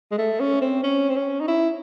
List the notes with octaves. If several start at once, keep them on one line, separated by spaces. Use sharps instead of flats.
G#3
A3
C#4
C4
C#4
C4
C#4
D#4
E4